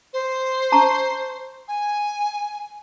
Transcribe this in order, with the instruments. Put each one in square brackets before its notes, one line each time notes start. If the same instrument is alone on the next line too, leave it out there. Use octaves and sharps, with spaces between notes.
[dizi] C5
[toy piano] A5 A#5 C#6
[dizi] G#5